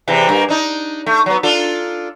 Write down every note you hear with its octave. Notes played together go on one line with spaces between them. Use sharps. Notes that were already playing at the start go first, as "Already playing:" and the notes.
E2 C3 E3
G2 A#3
D4 D#4
A3
F#3 B3
D4 F4 A4